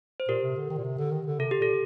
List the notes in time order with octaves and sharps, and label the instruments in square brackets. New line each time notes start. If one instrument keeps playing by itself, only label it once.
[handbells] C5
[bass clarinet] A#2 [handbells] G4 A#4
[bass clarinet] C3
D3
D#3
A#2
C3
D3
D#3
D3
[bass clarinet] C3 [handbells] A4
[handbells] G4
[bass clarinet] A#2 [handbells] A4